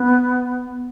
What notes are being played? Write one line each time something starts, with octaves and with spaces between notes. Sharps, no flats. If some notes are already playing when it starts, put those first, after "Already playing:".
Already playing: B3